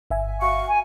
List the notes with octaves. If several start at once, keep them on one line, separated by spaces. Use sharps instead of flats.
G1 E5 G#5
F#4 F5 C#6
G#5